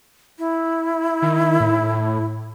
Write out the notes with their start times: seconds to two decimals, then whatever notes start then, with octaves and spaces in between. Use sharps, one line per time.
0.39 E4
1.22 D#3
1.60 A2